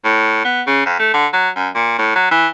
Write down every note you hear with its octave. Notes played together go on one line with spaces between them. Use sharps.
A2
B3
C#3
F2
A3
D3
F#3
F#2
A#2
A2
F#3
E3